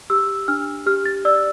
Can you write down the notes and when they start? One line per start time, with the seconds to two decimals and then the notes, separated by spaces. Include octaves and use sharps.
0.10 G4 E6
0.48 D4 F6
0.86 G4 F6
1.05 A6
1.25 D5 E6